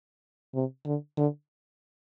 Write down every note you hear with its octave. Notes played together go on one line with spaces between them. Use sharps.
C3
D3
D3